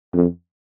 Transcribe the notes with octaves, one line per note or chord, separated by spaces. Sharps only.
F2